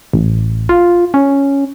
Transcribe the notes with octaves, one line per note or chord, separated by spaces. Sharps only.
A1
F4
C#4